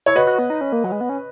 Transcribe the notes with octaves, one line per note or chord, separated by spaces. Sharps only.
E4 C#5
F#4 B4 D#5
F#4
B3
D#4
C#4
A#3
F#3
G#3
B3
C#4